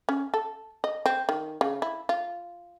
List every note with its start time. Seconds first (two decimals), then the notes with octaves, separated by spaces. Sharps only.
0.09 C#4
0.34 A4
0.84 D#5
1.06 C4
1.29 D#3
1.61 C#3
1.82 E4
2.09 F4